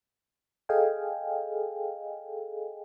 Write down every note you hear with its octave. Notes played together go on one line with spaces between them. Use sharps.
G#4 A4 D#5 F5 G5 G#5